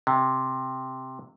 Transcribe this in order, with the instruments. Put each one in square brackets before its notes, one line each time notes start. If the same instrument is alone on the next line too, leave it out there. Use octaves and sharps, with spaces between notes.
[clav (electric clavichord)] C3